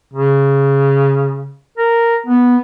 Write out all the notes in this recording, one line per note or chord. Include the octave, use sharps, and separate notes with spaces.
C#3
A#4
B3